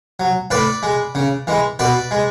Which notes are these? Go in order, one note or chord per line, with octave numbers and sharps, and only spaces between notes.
F#3
A2 B4 D5
G#3
C#3
E3 G#3
B2 B4 D5
G#3